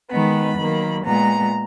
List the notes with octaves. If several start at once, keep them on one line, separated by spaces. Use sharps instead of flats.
D#3 G#3 B3 B5
D#3 F#3 A#3
A#2 G#3 B3 A#5